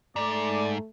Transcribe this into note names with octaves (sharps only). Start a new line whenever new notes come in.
G#2 A3 D5